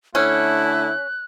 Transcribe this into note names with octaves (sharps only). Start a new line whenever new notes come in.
D3 A3 C#4 E4 F#6